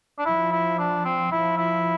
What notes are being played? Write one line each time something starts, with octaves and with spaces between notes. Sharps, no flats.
D4
F3 E4
E4
D4
C4
F3 E4
E4